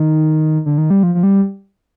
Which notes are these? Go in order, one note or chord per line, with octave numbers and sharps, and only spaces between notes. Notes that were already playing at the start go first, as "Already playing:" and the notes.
Already playing: D#3
D3
D#3
G3
F3
F3
G3